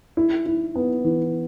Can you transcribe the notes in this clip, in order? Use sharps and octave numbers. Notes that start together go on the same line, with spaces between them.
E4
E4
B3
E3